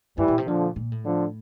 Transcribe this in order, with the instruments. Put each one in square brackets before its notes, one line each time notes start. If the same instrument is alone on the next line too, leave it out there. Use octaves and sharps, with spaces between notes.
[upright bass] G2 [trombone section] E3 G3
[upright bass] A#2
C3
[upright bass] A#2 [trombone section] D3 F3
[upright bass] A#2
A2
[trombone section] D3 F3